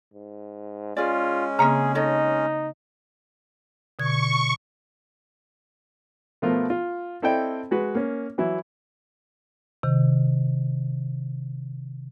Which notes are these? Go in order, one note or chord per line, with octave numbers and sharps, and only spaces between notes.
G#2
G#3 C#4 F4 G#4 D5
C#3 A#3 C4 G#4 D#5 E5 A#5
D#4 A4 C#5 D#5
B2 D3 C#6 G#6
B2 F3 A3 B3 F4 A#4
F4
C4 E4 A4 D5 D#5 G5
G#3 F#4 B4
A#3 C#4
E3 F#3 E4
C3 D#3